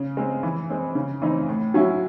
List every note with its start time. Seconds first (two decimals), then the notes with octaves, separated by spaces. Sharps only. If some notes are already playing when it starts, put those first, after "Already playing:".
Already playing: C#3
0.17 G#3 C4
0.43 E3
0.70 G#3 C4
0.95 C#3
1.22 E3 C4 D#4
1.48 A2
1.74 F#3 C#4 E4